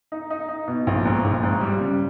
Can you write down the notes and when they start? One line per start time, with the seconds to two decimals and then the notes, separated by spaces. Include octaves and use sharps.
0.12 D#4
0.30 D#4
0.48 D#4
0.68 B2
0.87 A#1
1.05 G#2
1.24 A#1
1.43 G#2
1.61 G3
1.80 C#3